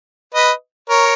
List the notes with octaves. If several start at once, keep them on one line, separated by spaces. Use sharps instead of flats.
B4 D#5
A#4 C#5